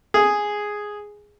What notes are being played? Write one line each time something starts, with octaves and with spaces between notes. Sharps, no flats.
G#4